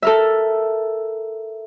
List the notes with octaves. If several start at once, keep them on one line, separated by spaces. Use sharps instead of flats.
A4 A#4 E5